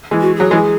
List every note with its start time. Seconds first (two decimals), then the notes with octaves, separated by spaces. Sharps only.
0.11 E3 G#3
0.21 F#4
0.36 F#3 G#4
0.51 E3 G#3